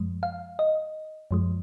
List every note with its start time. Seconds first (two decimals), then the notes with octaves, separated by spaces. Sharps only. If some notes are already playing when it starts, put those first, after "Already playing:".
Already playing: F#2 F3 G#3
0.23 F5
0.59 D#5
1.31 F#2 F3 G#3